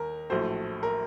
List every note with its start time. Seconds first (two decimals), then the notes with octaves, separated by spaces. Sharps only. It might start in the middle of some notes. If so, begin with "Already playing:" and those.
Already playing: D#2 A#4
0.30 A#1 A2 F#3 A3 C5
0.83 A#4